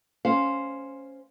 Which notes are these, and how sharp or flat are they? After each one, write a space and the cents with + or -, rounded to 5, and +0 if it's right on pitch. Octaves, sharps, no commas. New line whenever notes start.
C#4 +0 C5 +0 F5 +0